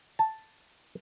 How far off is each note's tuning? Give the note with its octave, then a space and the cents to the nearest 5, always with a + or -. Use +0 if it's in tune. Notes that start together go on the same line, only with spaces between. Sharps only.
A5 +0